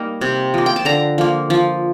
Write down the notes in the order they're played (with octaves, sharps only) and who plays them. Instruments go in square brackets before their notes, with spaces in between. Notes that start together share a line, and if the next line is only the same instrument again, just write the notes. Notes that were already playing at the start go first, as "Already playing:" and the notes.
Already playing: [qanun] G3 A#3 D#4
C3
F3 A#3
G5
A5
D3 A#5
F3 A#3
F3